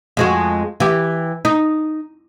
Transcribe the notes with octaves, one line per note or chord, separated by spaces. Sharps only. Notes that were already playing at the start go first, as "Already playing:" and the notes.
F2 G#3 F#4
E3 G4
D#4